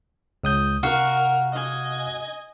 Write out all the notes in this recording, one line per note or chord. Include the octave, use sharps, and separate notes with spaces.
C#2 D#6 G6
C3 F#4 A#4 F5 C#6
D#5 G#5